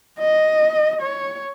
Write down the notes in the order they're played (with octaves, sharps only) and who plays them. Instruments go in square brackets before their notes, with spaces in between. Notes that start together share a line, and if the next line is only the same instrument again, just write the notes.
[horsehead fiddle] D#5
C#5